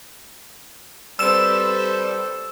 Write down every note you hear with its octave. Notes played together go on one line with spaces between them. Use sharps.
G3 C4 A4 B4 C5 E6 E7